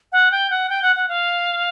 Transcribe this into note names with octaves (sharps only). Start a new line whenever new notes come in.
F#5
G5
F#5
G5
F#5
F#5
F5